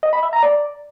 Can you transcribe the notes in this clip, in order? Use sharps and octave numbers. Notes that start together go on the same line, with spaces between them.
D#5
B5
E5
A#5
D5